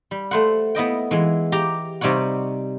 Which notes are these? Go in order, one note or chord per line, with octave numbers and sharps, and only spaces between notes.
G3
A3 C5 F#5
B3 E4 D#5 G5
E3 G#3
G4 A#5
C3 G3 D#4 C#5 F#5